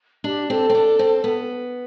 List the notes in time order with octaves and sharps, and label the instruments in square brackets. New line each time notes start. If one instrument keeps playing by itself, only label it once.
[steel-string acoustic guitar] D4 [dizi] G4
[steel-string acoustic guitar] C4 [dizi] A4
[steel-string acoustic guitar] C4
D4
C4
B3